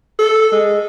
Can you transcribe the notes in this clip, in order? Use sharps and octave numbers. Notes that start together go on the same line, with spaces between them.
A4
G#3